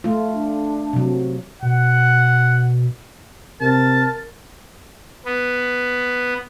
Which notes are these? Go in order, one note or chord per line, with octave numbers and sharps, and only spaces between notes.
A3 F4
D4
C3 F#3
B2 F#5
C3 A#4 A5
B3